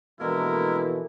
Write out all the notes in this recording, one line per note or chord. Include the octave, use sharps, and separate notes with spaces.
B2 D3 E3 F3 G#3 A#3 E4 A#4